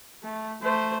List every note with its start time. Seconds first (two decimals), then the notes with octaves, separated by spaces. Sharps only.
0.23 A3
0.62 A3 C5